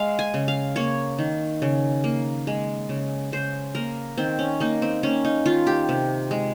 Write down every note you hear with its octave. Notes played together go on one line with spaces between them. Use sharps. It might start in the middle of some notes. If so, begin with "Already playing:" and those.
Already playing: G#3 F5
G#5
C#3
F5
A#3 C#5
D#3
C#3
A#3
G#3
C#3
C#3 C5
A#3 A#4
D#3 C4
C#4
A#3 D#4
C4
A#3 C#4
D#4
D#3 F4
G4
C3
G#3